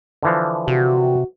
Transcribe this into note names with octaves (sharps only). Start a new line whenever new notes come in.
D3 E3 F3
C3 F#4